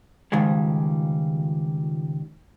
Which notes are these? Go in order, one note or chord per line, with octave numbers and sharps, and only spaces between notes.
C#2 G#2 D#3 F3 G3 G#3